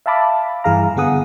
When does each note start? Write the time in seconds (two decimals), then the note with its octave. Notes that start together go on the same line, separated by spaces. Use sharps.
0.06 E5 F5 A5 B5 D6
0.64 G2 E3 G#4 F5 A#5
0.96 D3 B3 G#4 F#5 D#6